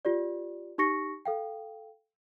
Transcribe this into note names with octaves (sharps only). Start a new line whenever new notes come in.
F4 G4 D5
D#4 G4 C#6 A#6 C#7
A4 F5 G5